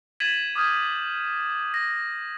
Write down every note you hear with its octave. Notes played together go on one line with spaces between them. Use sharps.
G#6 A6 B6 D#7 E7 F#7
D6 D#6 F6 G6 G#6
A#6